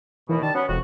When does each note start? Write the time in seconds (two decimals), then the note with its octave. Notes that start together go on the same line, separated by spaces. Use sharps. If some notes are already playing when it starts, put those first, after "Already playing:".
0.29 D#2 B2 E3
0.42 D#3 G3 A5
0.54 F#3 B3 C#4
0.69 E1 F2 F#4